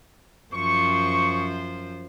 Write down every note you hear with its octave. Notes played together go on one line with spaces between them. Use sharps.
F#2 F3 C5 C#6